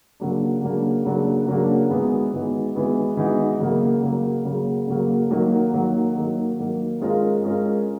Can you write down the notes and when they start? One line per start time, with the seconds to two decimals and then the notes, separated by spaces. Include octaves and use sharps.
0.20 C#3 F#3 A#3 D4
0.62 C#3 F#3 A#3 D4
1.04 C#3 F#3 A#3 D4
1.47 C#3 F#3 A#3 D4
1.90 E3 G#3 B3 D#4 F#4
2.33 E3 G#3 B3 D#4 F#4
2.75 E3 G#3 B3 D#4 F#4
3.17 E3 G#3 B3 D#4 F#4
3.60 C#3 F#3 A#3
4.02 C#3 F#3 A#3
4.45 C#3 F#3 A#3
4.87 C#3 F#3 A#3
5.30 D#3 F#3 A#3
5.74 D#3 F#3 A#3
6.16 D#3 F#3 A#3
6.59 D#3 F#3 A#3
7.01 G#3 C#4 F4 A#4
7.44 G#3 C#4 F4 A#4